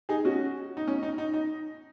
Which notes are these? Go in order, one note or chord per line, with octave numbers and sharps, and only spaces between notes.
D#4 G#4
C#4 F#4
D#4
C#4
D#4
D#4
D#4